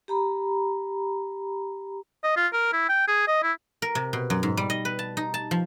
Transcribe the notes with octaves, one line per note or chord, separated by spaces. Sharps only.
G4 A#5 B5
D#5
F4
A#4
E4
G5
G#4
D#5
E4
A#4
C3
B2
F#2
G#2
G3
D#5
B4
A5
D#4
A5
F3